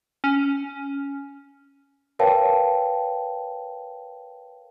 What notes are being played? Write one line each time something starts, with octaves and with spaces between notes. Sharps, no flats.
C#4
A#4 B4 C#5 F5 G5 A5